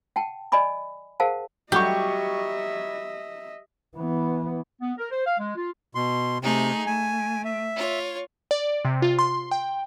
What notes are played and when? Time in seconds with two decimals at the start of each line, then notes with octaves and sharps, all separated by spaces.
0.16 F#5 G5 A5
0.52 D5 D#5 G#5 B5 D6
1.20 G#4 A#4 C5 F5 F#5 A5
1.72 F#3 G3 G4 D#5 E5 C#6
3.97 E3 B3
4.81 B3
4.98 A#4
5.11 C5
5.25 F5
5.39 G#3
5.56 F4
5.95 B2 C6
6.41 C3 A3 D#4 G#4
6.87 A3 G#5
7.45 E5
7.76 F4 C#5
8.51 D5
8.85 C3
9.02 F4
9.19 C6
9.51 G5